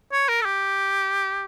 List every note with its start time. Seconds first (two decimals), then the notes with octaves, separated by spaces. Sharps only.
0.12 C#5
0.29 A#4
0.41 A4
0.45 G4